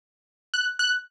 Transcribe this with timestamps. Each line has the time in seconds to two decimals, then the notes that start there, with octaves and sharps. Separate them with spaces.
0.54 F#6
0.79 F#6